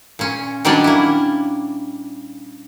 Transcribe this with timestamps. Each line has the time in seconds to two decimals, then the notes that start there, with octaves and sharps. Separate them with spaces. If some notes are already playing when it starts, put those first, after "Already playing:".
0.19 A#2 C#4
0.65 D#3 F#3 G3 C#4 D4 D5
0.84 A#3 E4